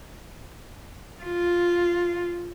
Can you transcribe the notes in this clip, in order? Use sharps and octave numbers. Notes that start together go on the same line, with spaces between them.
F4